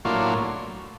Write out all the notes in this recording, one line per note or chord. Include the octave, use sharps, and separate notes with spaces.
A2 F#3 A#3 D4 F4